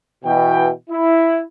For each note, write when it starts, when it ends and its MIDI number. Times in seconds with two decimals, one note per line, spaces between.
0.24 0.69 47
0.24 0.69 52
0.24 0.69 79
0.90 1.41 64